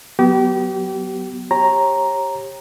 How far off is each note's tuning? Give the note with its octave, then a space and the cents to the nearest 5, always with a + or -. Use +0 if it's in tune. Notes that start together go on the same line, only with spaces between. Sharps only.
F#3 +0 B3 -5 G4 -30
G4 +0 C#5 -30 A#5 +0